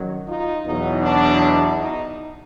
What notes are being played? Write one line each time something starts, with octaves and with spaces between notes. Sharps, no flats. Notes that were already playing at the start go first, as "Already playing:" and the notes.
Already playing: F#2 D#3 F#3
D#4 F4
E2 B2 F#3 D#4
D4
D#4